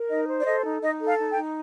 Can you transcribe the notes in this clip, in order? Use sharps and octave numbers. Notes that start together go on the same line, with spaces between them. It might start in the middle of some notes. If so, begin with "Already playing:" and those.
Already playing: A#4
D#4 D#5
C5
D5
A4 D#5
D#4
D#4 D#5
A4
F5
D#4
G5
D#4